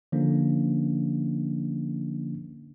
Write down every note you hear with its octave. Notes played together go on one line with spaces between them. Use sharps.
D3 F3 A#3 C#4 D4